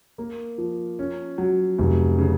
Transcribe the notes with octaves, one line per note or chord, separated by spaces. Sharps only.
A#3
F3
C#4
F#3
F1
C#3